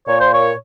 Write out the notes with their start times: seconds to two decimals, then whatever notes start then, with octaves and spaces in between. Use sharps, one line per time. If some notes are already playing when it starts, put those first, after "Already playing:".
0.07 A#2 C#5
0.20 C5
0.34 C#5